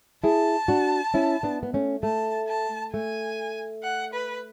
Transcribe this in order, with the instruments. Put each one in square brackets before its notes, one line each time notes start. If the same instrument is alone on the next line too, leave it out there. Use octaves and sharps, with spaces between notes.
[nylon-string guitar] E4 G#4 [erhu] A5
[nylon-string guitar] D4 F#4
C#4 E4
B3 D4
B3
A3 C#4
[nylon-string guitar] A3 [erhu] A5
[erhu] A5
[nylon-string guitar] A3 [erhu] G#5
[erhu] F#5
B4